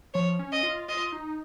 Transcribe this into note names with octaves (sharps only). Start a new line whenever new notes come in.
F3 C#5
C#4
D#5
F4
F4 D#5
D#4